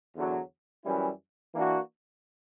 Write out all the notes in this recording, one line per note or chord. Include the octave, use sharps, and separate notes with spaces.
E2 D3 F#3
F#2 E3 G3 C#4 E4
E3 A#3 D4 F#4